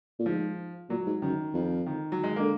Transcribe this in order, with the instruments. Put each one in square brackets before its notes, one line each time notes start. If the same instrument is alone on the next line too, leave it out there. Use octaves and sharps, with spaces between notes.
[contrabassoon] A#2
[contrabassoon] G#2 [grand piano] F3
[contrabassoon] A#2 [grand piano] F#3
[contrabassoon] G#2
[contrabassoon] F#2 [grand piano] D#3
[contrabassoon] F2
[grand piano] D#3
F#3
G#3
[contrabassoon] D3 [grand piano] A#3